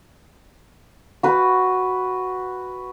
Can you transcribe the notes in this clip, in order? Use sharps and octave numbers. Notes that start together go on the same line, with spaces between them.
F#4 B4